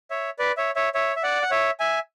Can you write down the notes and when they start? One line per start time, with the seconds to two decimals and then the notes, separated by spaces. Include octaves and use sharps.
0.10 C#5 E5
0.39 B4 D5
0.57 C#5 E5
0.76 C#5 E5
0.94 C#5 E5
1.16 E5
1.23 D5 F#5
1.43 F#5
1.51 C#5 E5
1.80 E5 G#5